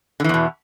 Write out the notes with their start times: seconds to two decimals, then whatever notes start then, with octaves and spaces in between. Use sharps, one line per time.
0.20 D3
0.24 E3
0.29 E2
0.34 B2